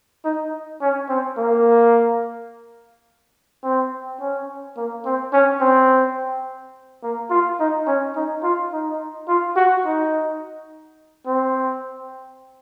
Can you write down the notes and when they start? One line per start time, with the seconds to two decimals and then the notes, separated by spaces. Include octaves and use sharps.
0.25 D#4
0.81 C#4
1.09 C4
1.38 A#3
3.64 C4
4.20 C#4
4.77 A#3
5.06 C4
5.33 C#4
5.61 C4
7.03 A#3
7.31 F4
7.60 D#4
7.87 C#4
8.16 D#4
8.43 F4
8.73 D#4
9.28 F4
9.56 F#4
9.85 D#4
11.26 C4